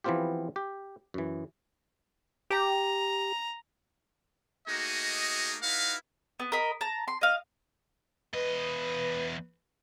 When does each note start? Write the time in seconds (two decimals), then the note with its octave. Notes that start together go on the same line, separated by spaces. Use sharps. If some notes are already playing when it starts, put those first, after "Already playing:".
0.04 E3 F3 B3 C4 F4 G4
0.56 G4
1.14 F#2 E3
2.50 G4 A#5
4.68 A3 A#3 D#4 F#4 G#4 D#5
5.63 D#4 E4 F#4 B4 F5
6.40 B3
6.52 A#4 D#5 B5
6.81 A5 A#5
7.08 C6
7.21 D#5 F5
8.34 E2 B4 D#5